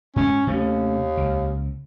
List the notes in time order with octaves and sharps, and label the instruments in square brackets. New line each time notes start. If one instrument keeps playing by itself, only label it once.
[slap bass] G#2 [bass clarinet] C#4
[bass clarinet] D#2 [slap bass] C3 A3 C#4
[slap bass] C#2